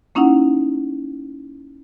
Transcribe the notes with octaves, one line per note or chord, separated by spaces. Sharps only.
A#3 C#4 D#4 E4 F#5